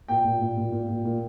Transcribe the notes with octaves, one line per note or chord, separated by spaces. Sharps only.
A#2 G5
A#2
A#2
A#2
A#2
A#2
A#2